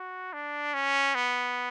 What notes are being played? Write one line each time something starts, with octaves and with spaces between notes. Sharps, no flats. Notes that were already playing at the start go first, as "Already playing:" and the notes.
Already playing: F#4
D4
C#4
B3